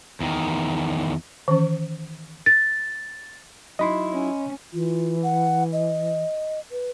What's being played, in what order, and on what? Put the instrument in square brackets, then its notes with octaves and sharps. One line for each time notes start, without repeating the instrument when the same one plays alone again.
[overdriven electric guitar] E2 D#3
[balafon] D#3 E3 C#4
[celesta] A6
[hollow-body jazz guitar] F#3 D#4 E4 [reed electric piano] D#5 B5 C6
[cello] C#4
[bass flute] E3 [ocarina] F4
[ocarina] F#5
D#5
B4